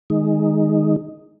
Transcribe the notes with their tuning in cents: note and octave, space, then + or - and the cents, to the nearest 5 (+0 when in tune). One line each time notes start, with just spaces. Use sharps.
D#3 +0 G#3 +0 D#4 +0